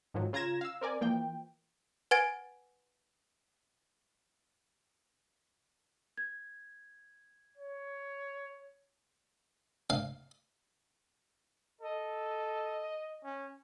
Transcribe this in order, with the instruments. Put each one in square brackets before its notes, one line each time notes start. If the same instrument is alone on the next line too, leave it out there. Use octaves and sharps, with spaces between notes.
[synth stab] G#2 D#3 F3 F#3
C#3 F4 A#5 G#6 A#6 E7
F5 E6
C4 A#4 D5 G#5
E3 F3 A#3 G5
[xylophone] B4 F#5 G#5 G#6 A6 D7
[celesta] G#6
[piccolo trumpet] C#5
[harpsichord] F5
[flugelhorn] A4 [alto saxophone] D#5
[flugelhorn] C#4